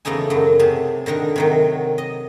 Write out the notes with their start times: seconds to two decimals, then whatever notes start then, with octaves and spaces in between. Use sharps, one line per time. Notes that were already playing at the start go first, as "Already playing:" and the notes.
0.05 E2 C#3 A3 D#4 G#5
0.30 F#2 F#3
0.59 C3 G#4 A5
1.06 D3 D#3 D#4 A#4
1.36 C3 D#3 F#3
1.98 D#5